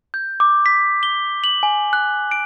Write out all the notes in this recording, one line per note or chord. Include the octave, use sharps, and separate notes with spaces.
G6
D6
B6
G7
F#7
G#5
F#6
D7